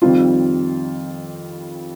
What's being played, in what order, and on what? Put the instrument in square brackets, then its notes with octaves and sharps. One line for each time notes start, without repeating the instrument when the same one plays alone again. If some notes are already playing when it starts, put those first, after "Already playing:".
[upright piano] F2 D#3 G3 C4 [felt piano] F4